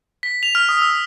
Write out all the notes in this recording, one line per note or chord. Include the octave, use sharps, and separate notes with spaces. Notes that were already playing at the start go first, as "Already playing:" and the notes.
B6
F7
F6
D#6
E6